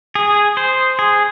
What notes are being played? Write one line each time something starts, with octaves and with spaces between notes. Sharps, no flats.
G#4
C5
G#4